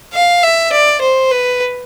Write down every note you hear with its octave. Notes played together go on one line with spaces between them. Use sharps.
F5
E5
D5
C5
B4